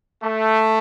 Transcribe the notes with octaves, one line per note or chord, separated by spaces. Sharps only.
A3